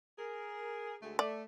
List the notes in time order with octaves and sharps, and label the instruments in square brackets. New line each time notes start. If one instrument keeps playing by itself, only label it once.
[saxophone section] G#4 A#4
D2 G#3 A3
[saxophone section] A3 [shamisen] D5